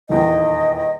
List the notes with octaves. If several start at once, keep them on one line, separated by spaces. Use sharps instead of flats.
D#1 E2 D#3 D#5